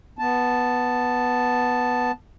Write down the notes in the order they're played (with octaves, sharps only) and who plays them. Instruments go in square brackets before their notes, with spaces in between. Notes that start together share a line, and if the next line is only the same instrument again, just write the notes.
[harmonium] B3 A5